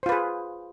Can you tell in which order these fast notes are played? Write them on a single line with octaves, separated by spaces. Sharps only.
C5 F4 B4 G#4